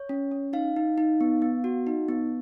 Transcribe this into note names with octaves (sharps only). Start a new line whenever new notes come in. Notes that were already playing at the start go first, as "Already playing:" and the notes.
Already playing: C#5
C#4
C#4
D#4 F5
D#4
D#4
B3
B3
F#4
D#4
B3